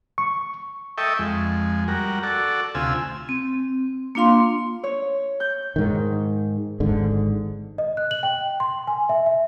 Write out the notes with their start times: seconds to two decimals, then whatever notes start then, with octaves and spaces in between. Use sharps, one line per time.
0.18 C#6
0.98 A4 D#5 E5 G5 C#6
1.19 F2 G#3
1.88 G3 F#4 A#4
2.23 F#4 A4 D5
2.75 D2 C3 F4 G#5 E6
3.29 C4
4.15 A#3 D4 F4 F5 C6
4.84 C#5
5.40 G6
5.76 G#2 D#3
6.80 G#1 G#2 D3
7.78 D#5
7.97 F#6
8.11 F#7
8.23 G5
8.60 C6
8.87 G#5
9.09 E5
9.26 E5